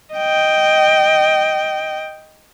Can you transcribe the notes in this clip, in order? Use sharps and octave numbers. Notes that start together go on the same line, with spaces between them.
D#5 G5